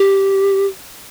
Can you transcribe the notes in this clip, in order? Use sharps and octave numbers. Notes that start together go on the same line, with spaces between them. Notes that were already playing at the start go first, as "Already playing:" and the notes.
Already playing: G4